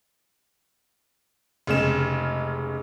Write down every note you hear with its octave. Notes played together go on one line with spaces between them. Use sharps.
F1 C#3 G#3 E7